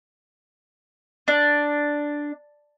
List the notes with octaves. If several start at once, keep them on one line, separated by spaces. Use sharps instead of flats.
D4